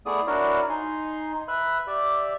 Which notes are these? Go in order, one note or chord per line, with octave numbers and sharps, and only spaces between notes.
A3 B3 E4 G#4 D5 D#6
D4 E4 F#4 A#4 C#5 D5
D#4 G#5 C6
B4 E5 B5
G4 D5 E5